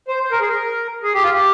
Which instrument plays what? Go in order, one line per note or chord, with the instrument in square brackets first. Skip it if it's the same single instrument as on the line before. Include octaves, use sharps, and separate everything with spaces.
[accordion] C5
C5
A#4
G#4
A#4
G#4
G4
F4
G4